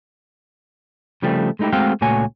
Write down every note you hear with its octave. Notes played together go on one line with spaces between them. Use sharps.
C#3 F3 G3 A3 C4
G#3 A3 D#4 E4 G4
G#3 A3 C4 F#4 F5 G5
C#2 A#2 A3 F#4 C#5 G#5